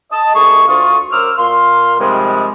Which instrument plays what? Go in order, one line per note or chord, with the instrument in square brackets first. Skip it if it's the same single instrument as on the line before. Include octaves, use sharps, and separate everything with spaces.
[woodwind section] D#5 A5
C2 A3 D#4 G#4 C#6
D2 F4 C#6 D#6
F#2 A#4 C5 D6 E6 F6
A#2 F5 C6
C3 D#3 F3 G3 G#3